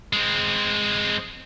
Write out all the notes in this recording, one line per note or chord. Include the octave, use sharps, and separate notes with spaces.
G#3 C4